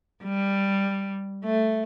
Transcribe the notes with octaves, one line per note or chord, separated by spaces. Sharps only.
G3
A3